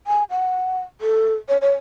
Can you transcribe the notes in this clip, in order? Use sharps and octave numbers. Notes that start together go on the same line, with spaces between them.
G#5
F#5
A4
C#5
C#5